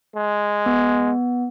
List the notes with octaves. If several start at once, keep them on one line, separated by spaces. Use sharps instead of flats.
G#3
B3